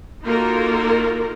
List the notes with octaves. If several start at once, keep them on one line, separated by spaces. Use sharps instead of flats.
A#3 D#4 F4 F#4 A4 A#4